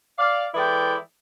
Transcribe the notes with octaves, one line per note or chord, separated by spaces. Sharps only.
D5 F5
E3 G#3 E4 A4 D5 G5